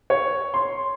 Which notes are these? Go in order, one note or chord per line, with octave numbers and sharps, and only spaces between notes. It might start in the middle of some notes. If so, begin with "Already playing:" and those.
C#5
C6